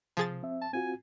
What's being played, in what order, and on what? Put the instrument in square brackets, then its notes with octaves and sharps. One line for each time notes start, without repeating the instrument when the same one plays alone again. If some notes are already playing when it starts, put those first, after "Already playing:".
[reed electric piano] C3 [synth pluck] F3 G#4 A6
[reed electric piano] C4 E5
[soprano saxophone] A5
[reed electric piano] C4 F4 F#4 [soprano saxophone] G#5